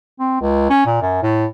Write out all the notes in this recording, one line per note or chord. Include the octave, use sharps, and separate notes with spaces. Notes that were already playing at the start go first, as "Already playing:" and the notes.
C4
C#2
C#4
A#2
F#2
A2